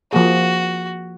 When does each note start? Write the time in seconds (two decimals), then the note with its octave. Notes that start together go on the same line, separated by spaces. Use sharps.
0.13 F3 A#3 F#4 G#4